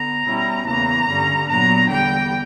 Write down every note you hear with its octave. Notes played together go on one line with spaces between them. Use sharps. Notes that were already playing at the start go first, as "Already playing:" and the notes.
Already playing: D3 B3 A#5
B2 G3 C#4 E4
E2 C#3 E3 A#3 A#5
G2 D3 G3 C#4
A#2 F#3 B3 D4 A#5
E2 D3 G3 G5